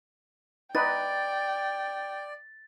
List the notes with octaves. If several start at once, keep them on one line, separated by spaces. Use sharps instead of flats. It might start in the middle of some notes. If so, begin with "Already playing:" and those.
D#4 B4 D5 G5 A6